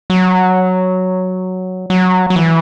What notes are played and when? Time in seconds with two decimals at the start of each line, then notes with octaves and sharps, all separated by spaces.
0.10 F#3
1.90 F#3
2.30 F#3
2.36 E3